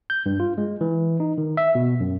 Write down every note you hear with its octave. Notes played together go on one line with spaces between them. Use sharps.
G6
G2
F4
G#3
E3
D#4
D#3
E5
B2
F#2